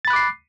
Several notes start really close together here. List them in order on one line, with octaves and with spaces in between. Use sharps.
A6 B5 F#6 D6 C7